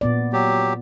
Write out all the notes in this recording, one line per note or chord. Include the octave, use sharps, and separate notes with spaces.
A#2 B3 D5
F#3 G4